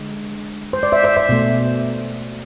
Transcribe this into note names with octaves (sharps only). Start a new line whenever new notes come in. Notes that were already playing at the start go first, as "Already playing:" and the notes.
Already playing: D3 G#3
C5
D5
C5 E5
C5 E5
C5 E5
B2 A3